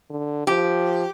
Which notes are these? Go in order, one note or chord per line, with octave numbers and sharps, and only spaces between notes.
D3
F3 G4